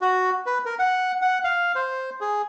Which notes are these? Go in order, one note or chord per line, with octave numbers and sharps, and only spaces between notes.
F#4
B4
A#4
F#5
F#5
F5
C5
G#4